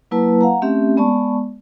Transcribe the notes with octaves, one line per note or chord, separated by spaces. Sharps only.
F#3 A#3 E4 B4 A5
F5 F#5 A#5
A3 C4 C#4 G4 E5
G#3 B3 D5 A5 C#6